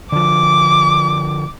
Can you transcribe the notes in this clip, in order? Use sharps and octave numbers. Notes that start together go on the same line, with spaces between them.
D3 F3 D6